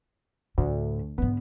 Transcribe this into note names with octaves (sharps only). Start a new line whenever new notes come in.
D2 A2
G#2 D3 B3